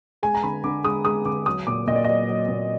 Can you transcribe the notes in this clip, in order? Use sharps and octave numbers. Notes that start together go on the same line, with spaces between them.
G#3 G#5
A#5
D3 B5
D3 D6
G#3 D#6
G#3 D#6
D3 D6
F#3 D#6
A#2 D6
A#2 D#5
D5
F#3 D#5
F#3
A#2